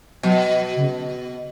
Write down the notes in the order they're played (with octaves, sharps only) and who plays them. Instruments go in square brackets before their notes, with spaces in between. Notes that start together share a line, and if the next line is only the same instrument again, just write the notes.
[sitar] B2 [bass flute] F#3
[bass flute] C#3